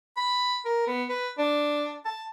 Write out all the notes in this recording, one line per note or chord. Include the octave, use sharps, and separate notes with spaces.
B5
A#4
B3
B4
D4
A5